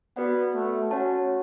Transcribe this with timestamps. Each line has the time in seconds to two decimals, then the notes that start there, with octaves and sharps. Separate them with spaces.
0.16 B3 F#4 B4 D5 F#5
0.54 A3
0.91 C#4 F#4 C#5 F#5 A5